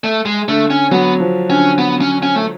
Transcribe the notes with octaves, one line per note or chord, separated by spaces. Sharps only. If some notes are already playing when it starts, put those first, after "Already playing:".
A3
G#3
D3 A3
C#4
F#3 B3
F3
D3 C#4
B3
C#4
C#4
A3